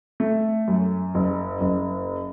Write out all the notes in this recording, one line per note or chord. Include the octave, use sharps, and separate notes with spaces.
A3
F#2
F#1
F#1